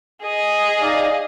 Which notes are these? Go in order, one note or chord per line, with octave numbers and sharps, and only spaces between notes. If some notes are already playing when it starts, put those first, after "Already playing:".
G#4 D#5
D#4 D5 F5